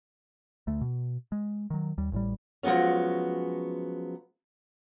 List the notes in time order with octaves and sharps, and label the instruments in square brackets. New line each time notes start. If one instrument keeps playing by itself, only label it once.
[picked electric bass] D2 A3
B2
G#3
D#3 F#3
D#2 G3
A1 A2 G3
[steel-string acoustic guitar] F3 F#3 G#3 B3 C#4